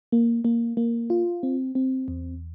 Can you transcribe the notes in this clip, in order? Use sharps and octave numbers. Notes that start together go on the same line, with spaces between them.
A#3
A#3
A#3
F4
C4
C4
E2